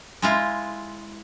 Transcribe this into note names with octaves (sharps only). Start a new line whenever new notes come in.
G#3 E4 F4